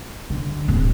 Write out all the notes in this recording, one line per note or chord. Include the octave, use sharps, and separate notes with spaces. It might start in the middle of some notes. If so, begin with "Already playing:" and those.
D3
D1